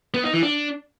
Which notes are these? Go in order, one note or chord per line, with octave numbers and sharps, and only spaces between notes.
B3
D#4
E3
D4